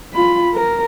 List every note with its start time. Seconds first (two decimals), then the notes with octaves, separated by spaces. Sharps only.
0.14 F4 B5
0.54 A#4